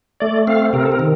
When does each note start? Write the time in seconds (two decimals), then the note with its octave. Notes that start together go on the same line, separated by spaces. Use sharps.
0.20 A3 D5
0.47 C4 F5
0.73 C3 A#4
0.83 A4
0.92 A#4
0.99 D#3